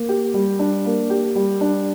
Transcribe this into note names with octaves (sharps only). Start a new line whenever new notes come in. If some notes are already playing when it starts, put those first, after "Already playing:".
Already playing: A#3
G4
G3
D4
A#3
G4
G3
D4